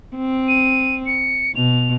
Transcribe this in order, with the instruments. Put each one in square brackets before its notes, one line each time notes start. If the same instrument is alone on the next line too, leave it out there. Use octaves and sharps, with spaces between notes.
[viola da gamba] C4
[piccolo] D#7
C#7
[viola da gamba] B2 [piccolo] F7